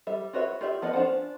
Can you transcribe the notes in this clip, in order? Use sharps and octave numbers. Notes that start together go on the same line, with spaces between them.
G3 E5
F4 F#4 B4 C#5 E5
F4 G4 D5 E5
F3 B3 D5 D#5
C#4 D4 F4 C5 F#5